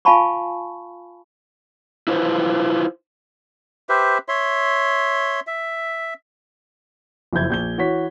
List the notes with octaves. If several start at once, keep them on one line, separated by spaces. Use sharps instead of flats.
F4 F5 G#5 A5 B5 C#6
E4 F4 B4 C5
G4 B4 C5 E5
C#5 E5 C6
E5
F#1 F2 E4 G6 G#6
A#1 G6 G7
E3 F#4 C#5 B6